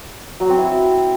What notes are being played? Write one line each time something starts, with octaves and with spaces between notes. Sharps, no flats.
F#3
C4
E4